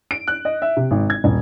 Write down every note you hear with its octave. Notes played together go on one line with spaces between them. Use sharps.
D7
F#6
D#5
E5
C3
G#1
G#6
D#1